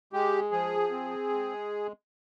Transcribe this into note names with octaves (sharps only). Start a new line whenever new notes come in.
G#3 G4
F3 G#4
C4
G#3